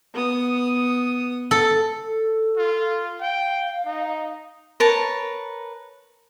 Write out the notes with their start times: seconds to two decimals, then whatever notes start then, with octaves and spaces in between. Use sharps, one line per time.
0.14 B3 D#6
1.51 A4
2.04 A4
2.57 F4
3.20 F5 G5
3.86 D#4
4.80 A#4 B4 C#5 A5